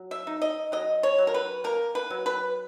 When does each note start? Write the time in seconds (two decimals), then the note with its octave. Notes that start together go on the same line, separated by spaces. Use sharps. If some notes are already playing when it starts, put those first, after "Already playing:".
Already playing: F#3
0.11 E5
0.27 D#4
0.42 D#5
0.72 F#3 D#5
1.03 C#5
1.18 F#3
1.27 A#4
1.34 B4
1.64 A#3 A#4
1.95 B4
2.10 F#3
2.26 B4